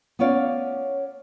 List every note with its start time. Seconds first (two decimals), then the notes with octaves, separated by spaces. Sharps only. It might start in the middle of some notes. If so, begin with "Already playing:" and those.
0.19 B3 C#4 C#5 D5 F5